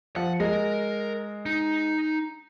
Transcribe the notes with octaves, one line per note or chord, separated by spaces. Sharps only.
F3 F#5
G#3 A#4
D#4